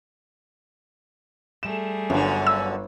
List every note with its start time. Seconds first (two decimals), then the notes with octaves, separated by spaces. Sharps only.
1.63 G3 A3 G#4 E7
2.10 G1 F#2 D3
2.47 E6